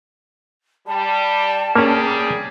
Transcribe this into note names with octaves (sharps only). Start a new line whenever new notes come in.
G3 A5
G2 G3 A#3 C#4 G#4